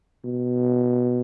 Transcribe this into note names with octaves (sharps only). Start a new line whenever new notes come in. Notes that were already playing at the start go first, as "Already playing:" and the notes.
B2